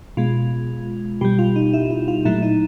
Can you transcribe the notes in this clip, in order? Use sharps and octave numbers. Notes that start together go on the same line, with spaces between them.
B2 G#3 F4
B2 G3 G4
F4
D#4
E4
E4
F4
A#2 F#3 A3 E4
D#4